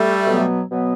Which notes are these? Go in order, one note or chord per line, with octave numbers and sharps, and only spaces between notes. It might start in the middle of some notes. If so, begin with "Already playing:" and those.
Already playing: G3 A3
B2 F#3 B3
B2 F#3 B3